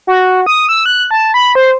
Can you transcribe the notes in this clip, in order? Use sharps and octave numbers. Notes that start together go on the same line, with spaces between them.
F#4
D#6
E6
F#6
A5
B5
C5